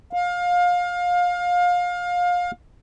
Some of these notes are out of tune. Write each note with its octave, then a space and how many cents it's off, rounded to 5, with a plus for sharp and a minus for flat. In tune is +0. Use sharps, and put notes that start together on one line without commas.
F5 +25